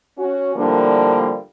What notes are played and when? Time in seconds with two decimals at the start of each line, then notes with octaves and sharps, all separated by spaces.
0.18 C#4 F#4
0.55 A2 D3 F3 G3 A#3 D4